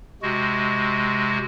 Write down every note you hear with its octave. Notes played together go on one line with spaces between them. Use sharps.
C3 G#3 F#4